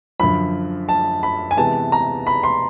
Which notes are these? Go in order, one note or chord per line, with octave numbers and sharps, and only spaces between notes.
F#2 D3 F3 B5
A5
B5
G#5
C3 E3 G#3 B3 A5
A#5
B5
C6